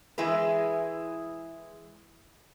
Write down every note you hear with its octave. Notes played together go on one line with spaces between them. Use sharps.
E3 G#3 E4 G#4 B4